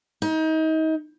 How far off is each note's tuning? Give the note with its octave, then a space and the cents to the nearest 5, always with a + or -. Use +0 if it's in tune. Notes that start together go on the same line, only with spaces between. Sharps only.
D#4 +30